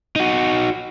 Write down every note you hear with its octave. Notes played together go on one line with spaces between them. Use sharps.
D#4 F#4